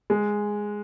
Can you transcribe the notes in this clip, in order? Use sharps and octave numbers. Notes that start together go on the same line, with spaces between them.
G#3